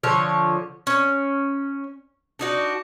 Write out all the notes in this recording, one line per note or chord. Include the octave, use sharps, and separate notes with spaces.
D3 F3 C#5
C#4
D4 D#4 F#4